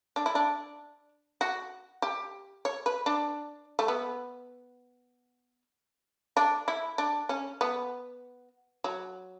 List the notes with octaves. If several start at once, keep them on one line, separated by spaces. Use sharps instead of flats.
D4
E4
D4
F#4
G4
C#5
B4
D4
A3
B3
D4
E4
D4
C#4
B3
F#3